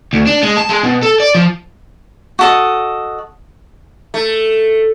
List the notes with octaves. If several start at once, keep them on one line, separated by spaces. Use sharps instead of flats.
D2
D4
G#3
A5
G#3
B2
A4
D5
F3
F#4 A4 D#5
A3